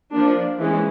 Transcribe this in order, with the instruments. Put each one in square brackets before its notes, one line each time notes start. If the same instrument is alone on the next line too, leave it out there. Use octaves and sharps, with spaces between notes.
[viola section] F3 A#3 D4
E3 G#3 C#4